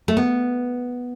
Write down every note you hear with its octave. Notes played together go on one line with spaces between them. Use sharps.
A3
B3